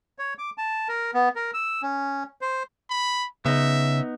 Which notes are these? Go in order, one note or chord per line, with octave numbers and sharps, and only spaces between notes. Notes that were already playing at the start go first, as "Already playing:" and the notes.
C#5
D6
A5
A#4
B3
A#4
E6
C#4
C5
B5
C#3 B3 D#4 E5